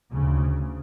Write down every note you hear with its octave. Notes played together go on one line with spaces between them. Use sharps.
D2 C#3